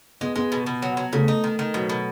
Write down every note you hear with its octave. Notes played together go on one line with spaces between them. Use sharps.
G#3 B3
G#3 B3
B2
B2
F#3
F#3
C#3 A3
D#4
D#3
D#3
B2 F#3
B2